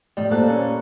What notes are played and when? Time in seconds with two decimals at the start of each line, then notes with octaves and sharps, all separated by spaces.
0.17 A2 G3 D#5
0.31 A#2 F4 A4 C5 F#6
0.48 C#4